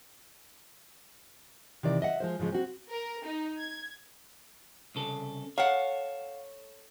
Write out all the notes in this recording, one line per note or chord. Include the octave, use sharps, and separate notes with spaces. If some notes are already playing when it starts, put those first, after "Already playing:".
C3 D#3 E3 D5
D#5 E5 F#5
F3 G#3 C5
G#2 C#3 F3 G#3
C4 F#4
A#4
D#4
G#6
C2 C#3 A4
A4 C#5 F5 F#5